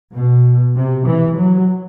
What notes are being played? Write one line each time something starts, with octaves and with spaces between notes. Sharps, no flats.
B2
C3
E3
F#3